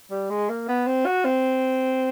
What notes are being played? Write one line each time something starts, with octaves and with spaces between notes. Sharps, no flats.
G3
G#3
A#3
B3
C4
F#4
C4